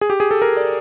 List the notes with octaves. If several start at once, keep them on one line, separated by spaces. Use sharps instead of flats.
G#4
G4
G#4
A4
A#4
D5